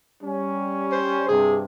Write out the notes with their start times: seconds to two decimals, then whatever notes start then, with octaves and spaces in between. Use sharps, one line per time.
0.23 G3 C#4
0.92 C5
1.28 G2 C3 G#4